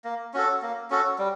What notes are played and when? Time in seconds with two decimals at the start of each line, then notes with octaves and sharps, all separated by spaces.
0.04 A#3
0.34 C#4 F#4 A4
0.62 A#3
0.90 C#4 F#4 A4
1.19 G3